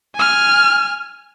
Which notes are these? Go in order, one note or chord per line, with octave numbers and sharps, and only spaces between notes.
G#5 F6